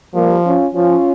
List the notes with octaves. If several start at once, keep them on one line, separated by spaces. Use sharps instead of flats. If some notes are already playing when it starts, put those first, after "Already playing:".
F3 G3 A#3
C#4 F4
F3 C#4 F4